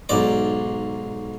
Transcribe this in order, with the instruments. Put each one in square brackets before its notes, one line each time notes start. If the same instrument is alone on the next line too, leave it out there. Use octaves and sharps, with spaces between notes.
[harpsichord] B1 G#2 D5 D6